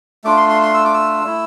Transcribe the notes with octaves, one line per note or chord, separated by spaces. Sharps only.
A3 D4 F4 D6
C6
C6
C6
E6
D6
E6
A3 E4